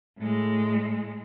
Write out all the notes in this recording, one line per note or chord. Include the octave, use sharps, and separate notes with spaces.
A2 G#3